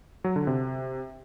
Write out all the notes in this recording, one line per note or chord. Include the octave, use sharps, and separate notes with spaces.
F#3
D3
C3